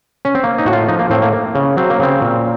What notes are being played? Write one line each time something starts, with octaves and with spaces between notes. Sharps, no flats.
C#4
C4
A#3
D#4
A2 F#4
F4
F3 D#4
A#3
A2 C4
A#3
A#3
C#3
F#3 C4
A#3
C#3 C4
A#2